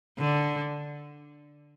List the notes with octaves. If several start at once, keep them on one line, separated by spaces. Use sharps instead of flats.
D3